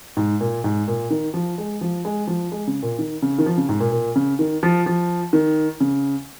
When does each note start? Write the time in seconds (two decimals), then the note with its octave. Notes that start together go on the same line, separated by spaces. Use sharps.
0.17 G#2
0.40 A#2
0.64 G#2
0.88 A#2
1.11 D#3
1.34 F3
1.58 G#3
1.81 F3
2.05 G#3
2.27 F3
2.52 G#3
2.67 C#3
2.82 A#2
2.99 D#3
3.22 C#3
3.39 D#3
3.46 F3
3.58 C#3
3.69 G#2
3.80 A#2
3.92 A#2
4.16 C#3
4.39 D#3
4.63 F3
4.86 F3
5.33 D#3
5.80 C#3